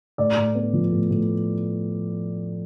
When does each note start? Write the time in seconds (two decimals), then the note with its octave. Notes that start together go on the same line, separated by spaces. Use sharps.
0.18 A2 D5
0.37 A2
0.55 B3
0.73 F3
0.92 A2
1.11 A2